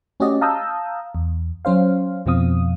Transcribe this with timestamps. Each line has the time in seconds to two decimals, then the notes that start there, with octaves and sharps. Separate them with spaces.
0.20 A3 C#4 F#4 G4 D5 D#5
0.41 F5 A5 A#5 D#6 E6 G6
1.15 E2
1.65 F#3 C#4 C5 F5
2.26 F2 B2 F3 C4 F5 D#6